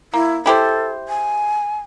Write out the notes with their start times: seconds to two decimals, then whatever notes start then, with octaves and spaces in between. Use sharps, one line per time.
0.14 A#3 E4
0.46 E4 G4 A4 C5
1.08 G#5